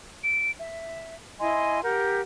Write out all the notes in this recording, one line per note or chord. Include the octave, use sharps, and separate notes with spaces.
D7
E5
E4 D#5 G#5 C6
G4 A#4 F#5 G6